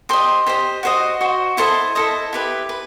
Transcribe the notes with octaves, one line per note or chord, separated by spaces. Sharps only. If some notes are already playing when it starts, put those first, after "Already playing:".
G4 C5 D#5 C6
G4 C5 D#5
F#4 C5 D#5
F#4 C5 D#5
E4 A4 C5 D#5 C6
E4 A4 C5 D#5
E4 G4 B4
B4